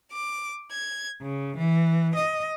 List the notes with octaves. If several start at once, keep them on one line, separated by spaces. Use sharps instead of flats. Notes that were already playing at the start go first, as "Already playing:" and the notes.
D6
G#6
C#3
E3
D#5